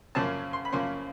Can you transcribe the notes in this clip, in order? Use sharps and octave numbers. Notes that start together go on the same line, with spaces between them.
F#2 C#3 F3 A#3 C#4 A5
C6
B5
F#2 C#3 F3 A#3 C#4 C6